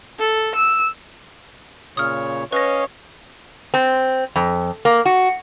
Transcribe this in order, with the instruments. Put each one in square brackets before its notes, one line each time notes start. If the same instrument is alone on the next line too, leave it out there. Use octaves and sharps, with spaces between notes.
[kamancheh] A4
E6
[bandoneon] A#2 C#3 C#5 [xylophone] D#6 F6
[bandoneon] C#4 D#5 F5 [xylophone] B4 A#6 [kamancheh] C#5
[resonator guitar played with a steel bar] C4
F2
A#3
F#4